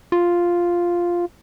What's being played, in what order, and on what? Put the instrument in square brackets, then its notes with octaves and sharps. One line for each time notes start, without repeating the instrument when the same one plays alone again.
[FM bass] F4